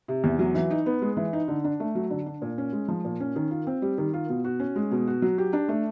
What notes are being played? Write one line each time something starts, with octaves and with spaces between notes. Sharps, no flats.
C3
E2
F#3
E3
D#4
B3
G#3
E3
D#4
D3
D4
A3
F#3
D3
D4
A#2
C#4
G#3
F3
A#2
C#4
D#3
F4
C4
G3
D#3
F4
B2
F#4
C#4
G#3
B2
F#4
F#3
G4
D4
A3